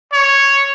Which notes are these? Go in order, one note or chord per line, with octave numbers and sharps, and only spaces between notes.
C#5